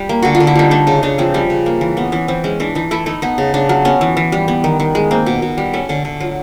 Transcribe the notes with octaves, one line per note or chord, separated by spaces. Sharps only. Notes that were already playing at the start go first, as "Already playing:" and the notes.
Already playing: G3
A#3
D3 F#4
F4
D3
E4
G3 D#4
A3 D4
C#3 D#4
C#3 D4
F3 C4
G3 C#4
C#3
A#3
E3
B3 C#4
E3 C#4
E3 C4
G#3 C#4
E3 D4
E3 D#4
A3 E4
A3 D#4
B3 D#4
C#3
C#3 D4
F#3
B3 C#4
E3
E3
G3
B3
D#3
D#3
G#3
A#3 C4
B2
B2
G3
A3 C#4
D3 C#4
D3
F#3 F4